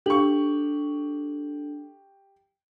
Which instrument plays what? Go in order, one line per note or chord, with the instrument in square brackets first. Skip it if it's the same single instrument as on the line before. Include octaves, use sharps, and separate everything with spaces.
[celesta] D4 A4 F#7 [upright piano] G4 C#6